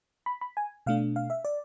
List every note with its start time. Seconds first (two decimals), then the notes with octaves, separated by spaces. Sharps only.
0.26 B5
0.41 B5
0.57 G#5
0.86 B2 A3 D4 F5
1.16 F5
1.30 E5
1.45 D5